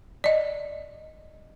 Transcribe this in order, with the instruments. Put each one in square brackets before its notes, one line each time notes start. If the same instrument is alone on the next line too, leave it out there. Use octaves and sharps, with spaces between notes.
[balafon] D5 D#5